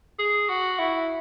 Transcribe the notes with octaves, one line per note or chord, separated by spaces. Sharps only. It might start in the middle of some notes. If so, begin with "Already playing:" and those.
G#4
F#4
E4